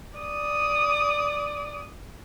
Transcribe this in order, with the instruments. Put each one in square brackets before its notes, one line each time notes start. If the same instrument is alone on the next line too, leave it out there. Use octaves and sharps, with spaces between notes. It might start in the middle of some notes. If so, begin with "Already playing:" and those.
[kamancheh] D5 D#6